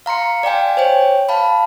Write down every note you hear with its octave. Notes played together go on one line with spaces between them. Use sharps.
F5 A#5 C6 C#7
D5 F5 G5 G#5
C5 C#5 G5
F5 A5 B5